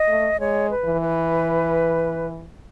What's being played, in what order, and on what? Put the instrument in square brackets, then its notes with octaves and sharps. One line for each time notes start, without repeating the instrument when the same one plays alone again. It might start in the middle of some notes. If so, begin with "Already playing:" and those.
Already playing: [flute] D#5
[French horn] A3
[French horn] G#3 [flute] C#5
[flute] B4
[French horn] E3
[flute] B4